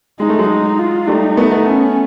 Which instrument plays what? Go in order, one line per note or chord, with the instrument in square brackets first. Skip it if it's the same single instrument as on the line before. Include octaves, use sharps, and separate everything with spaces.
[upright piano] G#3 [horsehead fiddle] D#4
[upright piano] A3
F#3 G#3
[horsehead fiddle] D#4
F4
[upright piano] G3 A3 [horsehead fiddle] D#4
[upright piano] A3 B3
A3 B3
[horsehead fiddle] C#4